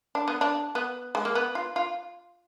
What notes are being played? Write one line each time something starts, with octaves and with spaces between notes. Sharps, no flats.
D4
B3
D4
B3
G#3
A#3
B3
F4
F4